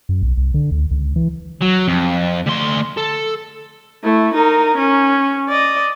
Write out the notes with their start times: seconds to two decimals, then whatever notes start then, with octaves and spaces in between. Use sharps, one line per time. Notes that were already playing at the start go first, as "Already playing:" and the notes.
0.09 F#2
0.23 B1
0.38 C2
0.54 D3
0.72 D2
0.91 C#2
1.16 E3
1.61 F#3
1.88 F2
2.46 D2 C6
2.97 A4
4.04 A3 E4
4.34 D#4 A#4
4.78 C#4
5.49 D5 D#5